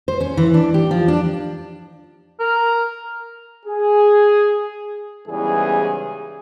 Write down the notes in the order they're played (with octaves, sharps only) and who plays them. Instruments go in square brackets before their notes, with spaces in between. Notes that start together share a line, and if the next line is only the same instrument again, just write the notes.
[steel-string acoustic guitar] C5
C#4
E3
D4
G4
F3
D4
[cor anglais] A#4
[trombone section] G#4
E2 G#2 C#3 E3 G3 G#4